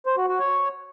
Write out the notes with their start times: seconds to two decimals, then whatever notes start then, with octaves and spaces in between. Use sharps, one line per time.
0.06 C5
0.17 F#4
0.28 F#4
0.39 C#5